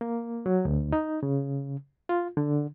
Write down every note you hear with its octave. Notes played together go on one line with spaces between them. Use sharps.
A#3
F#3
D2
D#4
C#3
F4
D3